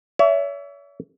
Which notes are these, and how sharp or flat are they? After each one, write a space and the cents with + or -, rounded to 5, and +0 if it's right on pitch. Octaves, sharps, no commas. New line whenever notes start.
C#5 +40 E5 +10